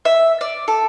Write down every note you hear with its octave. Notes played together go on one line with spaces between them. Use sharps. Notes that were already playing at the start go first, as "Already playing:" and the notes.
E5
D5
A4